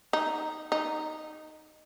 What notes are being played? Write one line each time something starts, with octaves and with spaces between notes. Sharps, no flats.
D#4
D#4